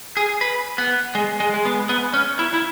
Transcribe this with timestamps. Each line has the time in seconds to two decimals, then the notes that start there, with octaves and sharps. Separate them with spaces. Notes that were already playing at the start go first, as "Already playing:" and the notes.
0.17 G#4
0.41 B4
0.78 B3
1.15 G#3
1.40 G#3
1.54 G#3
1.65 B3
1.89 B3
2.14 C#4
2.39 E4
2.54 E4